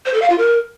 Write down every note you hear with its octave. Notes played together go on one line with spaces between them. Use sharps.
C5
A4
F5
F4
A#4